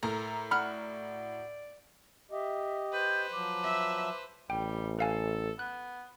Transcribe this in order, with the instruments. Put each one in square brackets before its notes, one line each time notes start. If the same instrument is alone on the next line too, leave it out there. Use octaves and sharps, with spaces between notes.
[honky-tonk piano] A2 A#5 [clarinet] A4 [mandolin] A#4
[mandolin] F#4 [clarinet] D5 [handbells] B5 F6
[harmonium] G4 D#5 [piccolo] E5
[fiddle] B4 C5 [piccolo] G6
[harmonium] F3 F#3 [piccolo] D6
[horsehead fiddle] E5
[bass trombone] A1 [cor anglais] G3 [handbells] G5
[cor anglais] A4 [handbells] B4 F5 G#5
[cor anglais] B3 [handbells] F#6